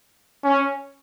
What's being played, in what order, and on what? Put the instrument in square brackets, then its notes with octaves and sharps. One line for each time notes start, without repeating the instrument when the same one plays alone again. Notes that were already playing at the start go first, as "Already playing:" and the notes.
[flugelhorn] C#4